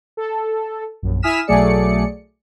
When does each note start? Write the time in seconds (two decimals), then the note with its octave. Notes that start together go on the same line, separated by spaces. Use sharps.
0.17 A4
1.02 A#1 F#2
1.22 E4 G#5 D#6 F6 B6 E7
1.47 B1 F#3 A3 G#4 D5 C#7